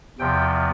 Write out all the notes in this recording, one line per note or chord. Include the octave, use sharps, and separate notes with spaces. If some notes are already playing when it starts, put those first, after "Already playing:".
E2 C3 F3 G5